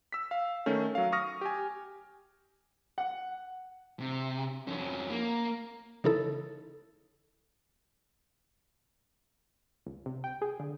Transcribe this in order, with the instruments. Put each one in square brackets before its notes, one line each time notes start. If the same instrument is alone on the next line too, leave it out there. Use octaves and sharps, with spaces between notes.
[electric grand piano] E6 B6
F5
D#3 A3 C#4
F#3 F5
C#6 D#6 F6 A#6
G4 G#5
[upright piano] F#5
[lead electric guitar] C3
F2 C#4
A#3
[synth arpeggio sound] C#3 E3 D#4 E4 A4
[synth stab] C#2
C3
G5
G#4
D3